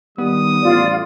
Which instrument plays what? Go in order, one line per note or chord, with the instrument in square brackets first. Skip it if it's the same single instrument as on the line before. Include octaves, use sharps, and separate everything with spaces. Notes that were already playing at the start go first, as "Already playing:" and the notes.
[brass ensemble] D#3 G3 [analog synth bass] B3 [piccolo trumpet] D#6
[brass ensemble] A1 F2 G3 [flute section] F4 D5